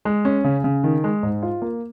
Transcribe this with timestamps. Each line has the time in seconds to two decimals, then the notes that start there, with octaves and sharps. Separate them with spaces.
0.05 G#3
0.25 C#4
0.44 C#3
0.64 C#3
0.84 D#3
1.04 G#3
1.23 G#2
1.43 F4
1.62 A#3